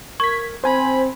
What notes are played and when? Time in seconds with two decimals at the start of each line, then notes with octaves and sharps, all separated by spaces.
0.20 A#4 C#6 G#6 B6
0.64 C4 C5 G#5 B5